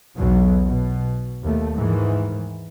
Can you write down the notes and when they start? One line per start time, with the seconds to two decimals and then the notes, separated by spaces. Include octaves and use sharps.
0.17 B1 E2 B2 F#3
0.64 B2
1.42 D#2 A3
1.75 G#2 D#3 E3